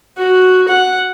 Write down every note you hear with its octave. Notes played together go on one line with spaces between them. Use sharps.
F#4
F#5